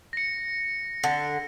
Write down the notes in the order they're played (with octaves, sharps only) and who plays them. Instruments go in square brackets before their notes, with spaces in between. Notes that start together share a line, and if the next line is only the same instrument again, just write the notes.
[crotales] A#6 C#7
[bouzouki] D3